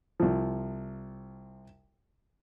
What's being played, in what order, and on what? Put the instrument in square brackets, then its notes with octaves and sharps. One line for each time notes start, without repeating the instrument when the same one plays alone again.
[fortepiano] C2 F3